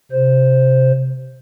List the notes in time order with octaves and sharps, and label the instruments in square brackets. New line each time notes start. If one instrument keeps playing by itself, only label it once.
[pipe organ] C3 C5